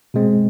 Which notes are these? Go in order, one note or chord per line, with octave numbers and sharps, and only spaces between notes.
B2 G#3 C4